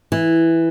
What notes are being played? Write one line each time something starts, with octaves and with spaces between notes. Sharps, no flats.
E3